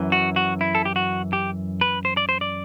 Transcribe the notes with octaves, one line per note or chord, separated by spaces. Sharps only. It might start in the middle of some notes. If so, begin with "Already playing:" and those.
Already playing: F#2 E3
F#4
F#4
E4
A4
G4
F#4
G4
B4
C5
D5
C5
D5